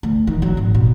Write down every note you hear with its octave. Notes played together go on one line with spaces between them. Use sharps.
D2
D#3
F#3
G#1
B2